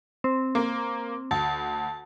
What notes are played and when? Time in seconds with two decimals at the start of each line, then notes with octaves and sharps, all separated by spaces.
0.24 C4
0.55 A#3
1.31 D2 A5